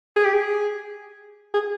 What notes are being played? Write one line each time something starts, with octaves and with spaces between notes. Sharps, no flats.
G#4
G4
G#4
G#4